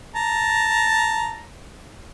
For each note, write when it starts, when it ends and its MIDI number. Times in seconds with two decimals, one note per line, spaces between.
0.16 1.46 81
0.16 1.46 82